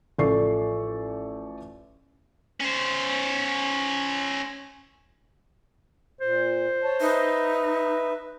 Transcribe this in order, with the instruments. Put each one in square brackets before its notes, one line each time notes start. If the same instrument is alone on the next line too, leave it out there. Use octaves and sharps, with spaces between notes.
[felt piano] A1 F3 A4 D5 C#6 C7
[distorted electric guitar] C#4 C5
[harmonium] A#2 [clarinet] C5
[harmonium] C#5 A5
[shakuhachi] D#4 [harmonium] B4 E5